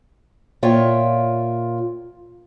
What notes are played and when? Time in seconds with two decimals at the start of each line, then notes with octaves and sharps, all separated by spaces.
0.63 A#2 F4 C#5 E5 G5